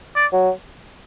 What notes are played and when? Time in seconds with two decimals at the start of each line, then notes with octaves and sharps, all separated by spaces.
0.16 D5
0.32 F#3